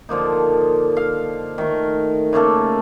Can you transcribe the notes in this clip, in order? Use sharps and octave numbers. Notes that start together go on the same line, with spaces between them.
D3 F3 A#3 D#4
F5
D#3 A3 A#4
C#3 A3 A#3 A4